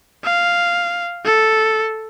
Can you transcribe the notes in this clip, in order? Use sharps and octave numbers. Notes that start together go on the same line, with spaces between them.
F5
A4